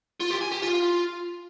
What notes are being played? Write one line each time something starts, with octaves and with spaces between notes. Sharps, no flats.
F4
G4
G#5
G4
F4